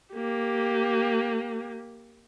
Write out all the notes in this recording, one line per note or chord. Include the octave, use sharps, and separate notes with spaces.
A#3 G4